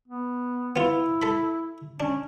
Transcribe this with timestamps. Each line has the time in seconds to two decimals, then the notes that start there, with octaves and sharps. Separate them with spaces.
0.08 B3
0.76 B3 E4 F4
1.22 A4 B5
2.00 C#4 D4